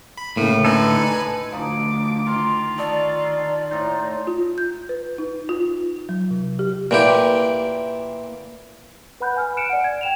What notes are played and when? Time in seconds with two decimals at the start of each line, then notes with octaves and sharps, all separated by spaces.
0.18 B5
0.37 A2 C#3 A#3
0.65 D3 D#4 A4 B4 G#5
1.52 D2 F3 D#4 D6
2.26 D#3 F4 C6
2.78 D#3 A4 D5 D#5 C#6
3.71 A2 D#4 C5
4.27 F4
4.58 G6
4.89 B4
5.18 D#4
5.49 F4
6.09 F#3
6.31 C3
6.59 G4
6.91 A#2 E3 G4
9.20 B4 F#5 B5 F#6 G6
9.36 G#5 F6
9.57 F#6 C#7 D7 E7
9.70 D5 F#5
9.84 G#6
10.01 G5 E7 F7